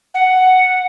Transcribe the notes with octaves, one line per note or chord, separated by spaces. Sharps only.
F#5